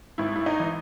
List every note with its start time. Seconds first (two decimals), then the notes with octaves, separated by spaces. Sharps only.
0.18 G#1 E4
0.36 E4
0.46 D#4
0.60 E3